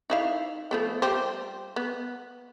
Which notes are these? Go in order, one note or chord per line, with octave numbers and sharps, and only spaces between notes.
D#4 E4 F5
F3 A3 B3
G3 G4 C5
B3